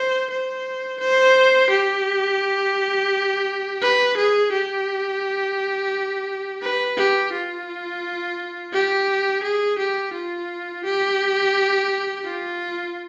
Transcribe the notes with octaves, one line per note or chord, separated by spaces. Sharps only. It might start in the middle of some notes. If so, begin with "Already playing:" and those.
Already playing: C5
C5
C5
G4
B4
G#4
G4
B4
G4
F4
G4
G#4
G4
F4
G4
F4